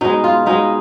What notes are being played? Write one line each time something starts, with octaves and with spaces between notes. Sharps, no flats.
B2 G#3 D#4
F4
B2 G#3 D#4